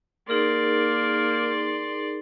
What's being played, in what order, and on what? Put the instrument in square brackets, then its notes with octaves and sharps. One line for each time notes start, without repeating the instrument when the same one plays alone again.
[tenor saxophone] A#3 [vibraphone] D#4 G#4 A#4 [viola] D5 C6